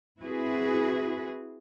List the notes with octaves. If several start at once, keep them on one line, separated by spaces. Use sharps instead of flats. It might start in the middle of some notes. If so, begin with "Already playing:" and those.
C4 E4 F#4 G#4 B4